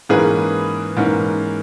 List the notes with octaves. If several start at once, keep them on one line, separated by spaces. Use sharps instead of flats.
G#2 E3 A#3 C#4 G#4 B4
G#2 E3 A#3 C#4